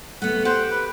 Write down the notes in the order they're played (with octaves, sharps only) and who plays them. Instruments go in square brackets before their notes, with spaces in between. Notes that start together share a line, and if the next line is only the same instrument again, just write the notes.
[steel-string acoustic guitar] A3 B3 [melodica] F#5
[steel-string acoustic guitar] G4 [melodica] C5 F#5
[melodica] B4